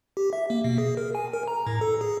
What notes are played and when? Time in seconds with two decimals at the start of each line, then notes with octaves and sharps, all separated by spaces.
0.17 G4
0.33 E5
0.50 A#3
0.64 B2
0.78 G#4
0.97 A#4
1.15 G#5
1.33 A#4
1.48 A#5
1.67 A2
1.81 A4
2.01 G#4